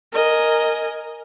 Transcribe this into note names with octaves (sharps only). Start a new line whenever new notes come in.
A#4 D#5 G#5